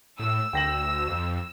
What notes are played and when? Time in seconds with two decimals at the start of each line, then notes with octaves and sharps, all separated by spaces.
0.19 A2 E6
0.53 D2 G5 A#6 F#7
1.08 F2